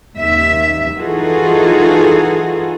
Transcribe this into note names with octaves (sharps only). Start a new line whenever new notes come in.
D#2 E5
E3 D#4 F4 F#4 G#4 A4